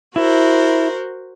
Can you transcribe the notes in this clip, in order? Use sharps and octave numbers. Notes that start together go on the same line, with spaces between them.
E4 F#4 A#4 C5